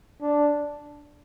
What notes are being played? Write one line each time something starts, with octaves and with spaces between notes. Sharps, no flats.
D4